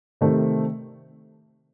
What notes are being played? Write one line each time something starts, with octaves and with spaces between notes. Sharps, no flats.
C3 D#3 A3 C4